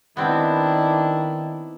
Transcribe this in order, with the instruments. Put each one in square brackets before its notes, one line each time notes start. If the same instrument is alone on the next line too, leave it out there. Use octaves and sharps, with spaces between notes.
[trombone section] D#3 [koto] B3 C4 [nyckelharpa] D4 E4